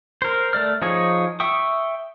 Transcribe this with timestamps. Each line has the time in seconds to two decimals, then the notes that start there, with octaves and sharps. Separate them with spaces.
0.22 A#4 C5
0.53 A3 D5 F6
0.82 F3 D#4 G#4 C#5
1.40 E5 G5 C#6 D#6